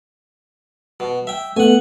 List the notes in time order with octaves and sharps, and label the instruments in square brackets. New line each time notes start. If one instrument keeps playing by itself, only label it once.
[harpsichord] B2
E5 G5
[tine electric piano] A3 B3 [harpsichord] F#5 G#5